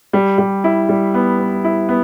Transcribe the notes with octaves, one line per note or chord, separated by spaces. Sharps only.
G3
G3
E4
G3
B3
B3
E4
B3